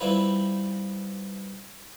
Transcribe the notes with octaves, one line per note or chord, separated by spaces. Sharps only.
E3 G3 C4 E4 F4 B4